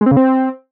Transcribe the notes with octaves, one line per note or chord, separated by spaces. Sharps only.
G#3
C4
C#3
C4